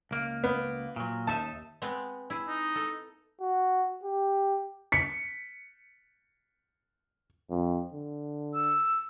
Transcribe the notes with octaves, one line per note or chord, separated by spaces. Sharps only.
C#2 A#3
B3
A#2 F#3
D#2 D#4 E5 A5
G#3 B3 C4
E4 G#4
D#4
A4
F#4
G4
B6 C#7
F2
D3
E6